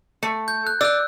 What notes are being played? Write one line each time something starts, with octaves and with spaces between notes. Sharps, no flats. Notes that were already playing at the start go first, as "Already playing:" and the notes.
A3
G6
F#6
D5 E6 F#6